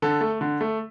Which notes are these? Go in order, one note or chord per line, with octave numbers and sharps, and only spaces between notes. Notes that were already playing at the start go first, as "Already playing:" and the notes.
D3 A4
A3
D3
A3